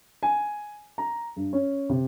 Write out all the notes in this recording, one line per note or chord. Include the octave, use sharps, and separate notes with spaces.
G#5
A#5
G2
C#4
C3